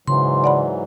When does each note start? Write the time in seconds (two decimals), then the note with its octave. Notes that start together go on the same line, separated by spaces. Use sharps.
0.08 G#2 C#3 E3 F#3 C6
0.44 D5 F#5 B5